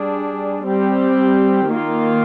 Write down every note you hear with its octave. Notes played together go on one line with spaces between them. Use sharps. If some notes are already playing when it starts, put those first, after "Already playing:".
Already playing: G3 D4 G#4
G3 C4 G4
D#3 A#3 F4